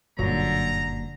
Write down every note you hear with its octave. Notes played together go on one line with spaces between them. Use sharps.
F#1 G2 A#2 D3 F#3 A#5